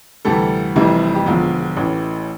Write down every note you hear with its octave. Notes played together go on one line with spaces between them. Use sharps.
D2 C3 E3 G3 A4
F1 F2 C3 E3 G3 E4
G4
E1 E2 D3 F3 F4
A1 A2 E3